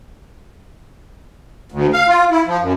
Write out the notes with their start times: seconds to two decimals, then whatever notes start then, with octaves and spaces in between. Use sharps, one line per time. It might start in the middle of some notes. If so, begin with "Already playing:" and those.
1.72 D2
1.93 F5
2.09 F4
2.31 E4
2.47 F3
2.60 F#2